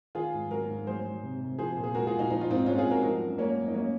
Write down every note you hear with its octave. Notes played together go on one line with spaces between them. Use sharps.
D#3 F4 G#4
G#2
F#3 F#4 A#4
G#2
F#3 G#4 C5
F#3
C3
C3
F3 G#4 C5
A#2
G#4
G#3 F#4 A#4
F4 G#4
A#2
D#4 F#4
F3 D#4
F4
G#2 C4 D#4
G#3 C#4 F4
F4 G#4
G#2
F#4 A#4
F3 F#4 A#4
F#2
G#3 A#3 C#4
F#2
D#4
F#3 A#3 C#4